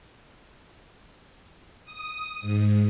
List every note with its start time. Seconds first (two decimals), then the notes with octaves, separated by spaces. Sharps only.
1.84 D#6
2.41 G#2